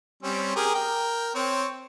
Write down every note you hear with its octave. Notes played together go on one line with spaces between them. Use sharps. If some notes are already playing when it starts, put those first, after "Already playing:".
G3 C4 C#4
G4 G#4 A#4
A#4 G5
C4 C#5